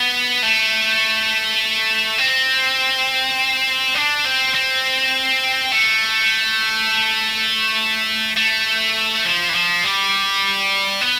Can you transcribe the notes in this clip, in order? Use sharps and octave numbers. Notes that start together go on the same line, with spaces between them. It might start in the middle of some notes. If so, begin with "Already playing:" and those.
Already playing: B3
A3
C4
D4
C4
C4
A3
A3
F3
E3
F3
G3
B3